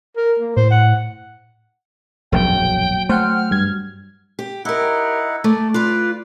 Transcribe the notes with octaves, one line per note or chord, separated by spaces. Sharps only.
A#4
A#3
A2 C5
F#5
E1 A#1 F#2 F#3 G5
A3 C5 F#5 G5 F6
G2 G#6
G4
D#4 E4 G4 A#4 F#5
A3 D5
F4 B4 D5